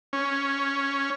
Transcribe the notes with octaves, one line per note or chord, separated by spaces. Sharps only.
C#4